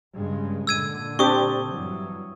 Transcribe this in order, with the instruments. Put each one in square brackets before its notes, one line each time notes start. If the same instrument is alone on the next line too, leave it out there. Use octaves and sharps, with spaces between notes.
[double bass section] G2 C#3 G#3
[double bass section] A#2 D3 [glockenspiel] E6 G#6 D#7
[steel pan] C4 D4 G4 [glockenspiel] C#6 D#6
[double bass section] G2 E3 F#3